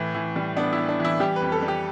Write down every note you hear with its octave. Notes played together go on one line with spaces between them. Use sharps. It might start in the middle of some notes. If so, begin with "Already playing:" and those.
Already playing: A2 E3
E3
G3
B3 D4
E4
B3
D4
E3 E4
G3 G4
B4
F2
A4
G3
G4